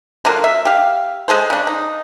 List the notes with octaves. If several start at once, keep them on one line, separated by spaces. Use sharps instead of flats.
D3 F#3 A#3 F4
E5
G4 F5
G#3 G#4 A4 C5
C#3 D4
D#4